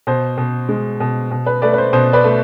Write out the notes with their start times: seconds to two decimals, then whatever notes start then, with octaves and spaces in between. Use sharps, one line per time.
0.07 B2 C5
0.37 B2
0.69 G#3
1.00 B2
1.31 B2
1.46 B4
1.62 A3 B4 D5
1.73 B4
1.78 C5
1.93 B2 C5
2.13 B4 D5
2.24 A3